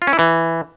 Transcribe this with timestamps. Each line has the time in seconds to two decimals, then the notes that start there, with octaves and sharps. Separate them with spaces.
0.02 F4
0.07 C#4
0.13 E4
0.19 E3